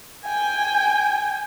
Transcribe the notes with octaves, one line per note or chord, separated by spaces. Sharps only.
G5 G#5